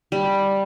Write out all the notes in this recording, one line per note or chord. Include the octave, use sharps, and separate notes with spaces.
G3